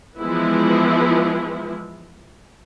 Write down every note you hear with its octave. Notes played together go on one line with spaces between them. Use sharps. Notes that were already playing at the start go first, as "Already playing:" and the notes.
E3 F3 G#3 B3 E4